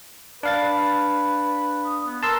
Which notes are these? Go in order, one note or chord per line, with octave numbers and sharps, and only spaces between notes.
D4 B4 F5 A6
D#6
B3
A#4 A5 C6 E6